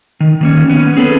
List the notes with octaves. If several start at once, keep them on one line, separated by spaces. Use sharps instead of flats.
D#3
D#3 A#3 C#4
B3 C#4
C4 G#4 A4 B4